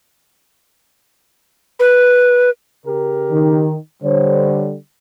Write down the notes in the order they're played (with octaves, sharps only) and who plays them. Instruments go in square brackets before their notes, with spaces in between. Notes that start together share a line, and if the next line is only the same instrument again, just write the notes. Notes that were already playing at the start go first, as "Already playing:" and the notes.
[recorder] B4
[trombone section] C#3 G4 A#4
[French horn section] D#3
[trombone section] D3 G3 [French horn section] C5 C#5